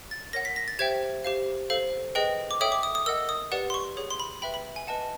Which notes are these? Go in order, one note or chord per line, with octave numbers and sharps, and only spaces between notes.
A6
A#4 C#5 F#5 A#6
B6
A#6
A6
G4 C5 E5 G5 G#6
G4 C5 F5
A4 C5 F5
G#4 B4 D#5 G5
D6
A4 C#5 E5 G5 D#6
D6
D#6
D#6
A#4 D#5 F#5 E6
D#6
G4 B4 D5 F#5
C6
C#6
G#4 C#5 F#5
C6
B5
B4 E5 G5 B5
B5
G#5
B4 D#5 F#5 A5